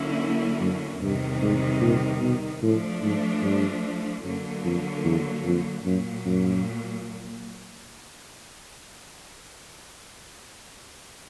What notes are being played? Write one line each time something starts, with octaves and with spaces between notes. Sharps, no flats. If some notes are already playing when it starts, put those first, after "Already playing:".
Already playing: D3 F#3 A#3 C#4 E4
F#2
E2 G2 C3 D#3 G3
G#2
A#2
B2
A2 F3 A3 D4
G#2
G2
F#2 D3 F#3 A#3
F2
E2
F2
F#2 A#2 F#3 A#3
F#2